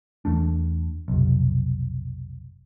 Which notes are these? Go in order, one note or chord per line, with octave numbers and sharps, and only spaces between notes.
E2 A3 D4
F1 B1